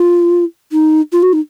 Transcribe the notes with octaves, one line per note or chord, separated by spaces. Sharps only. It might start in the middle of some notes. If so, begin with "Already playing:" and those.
Already playing: F4
D#4
F4
F#4
D#4